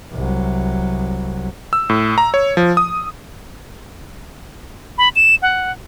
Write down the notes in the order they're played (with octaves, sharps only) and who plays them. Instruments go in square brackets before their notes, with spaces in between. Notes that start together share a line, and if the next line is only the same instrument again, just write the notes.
[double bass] C2 F#3
[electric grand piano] E6
A2
A#5
C#5
F3
D#6
[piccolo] B5
E7
F#5